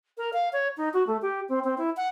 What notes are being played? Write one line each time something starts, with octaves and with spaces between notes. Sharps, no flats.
A#4
F5
C#5
D#4
F#4
A3
G4
C4
C4
E4
F#5